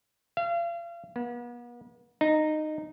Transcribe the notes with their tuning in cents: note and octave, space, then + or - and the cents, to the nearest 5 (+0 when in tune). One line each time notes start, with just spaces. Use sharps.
F5 -35
B3 -40
D#4 -15